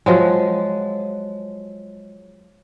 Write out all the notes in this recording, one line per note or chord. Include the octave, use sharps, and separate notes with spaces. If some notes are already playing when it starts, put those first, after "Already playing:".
F3 F#3 G#3